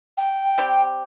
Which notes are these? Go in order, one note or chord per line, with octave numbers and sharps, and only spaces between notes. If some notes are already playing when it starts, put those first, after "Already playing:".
G5
G3 C4 G4